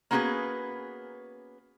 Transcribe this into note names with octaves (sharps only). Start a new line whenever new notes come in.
A#3 B3 C#4 F#4 G#4 B4